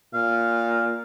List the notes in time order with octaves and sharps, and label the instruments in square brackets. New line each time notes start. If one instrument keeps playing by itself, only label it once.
[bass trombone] A#2 [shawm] F5